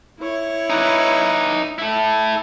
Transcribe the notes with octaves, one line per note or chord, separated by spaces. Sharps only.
E4 C#5
D#4 B4
E4 A4